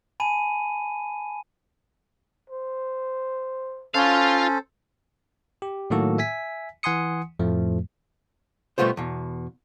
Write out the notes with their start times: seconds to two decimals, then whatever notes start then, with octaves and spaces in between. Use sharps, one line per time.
0.20 G#5 A5 B5 D#7
2.50 C5
3.94 C#4 F4 A4 C5 F5
5.62 G4
5.90 A2 D#3 F#3 A#3 F#4 A4
6.18 E5 G#5 B6
6.83 E3 F#5 G#5 C6 D#6 C#7
7.39 F2 A2 F3 A3
8.78 B2 G3 A3 B3 F4 C5
8.97 E2 B2